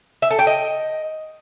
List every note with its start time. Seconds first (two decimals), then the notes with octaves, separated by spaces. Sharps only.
0.22 E5
0.30 A4
0.39 G5
0.47 D#5